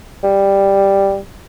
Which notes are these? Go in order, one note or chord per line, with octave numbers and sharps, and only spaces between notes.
G3